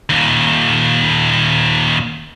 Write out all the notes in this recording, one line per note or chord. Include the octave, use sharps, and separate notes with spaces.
D#2 A#2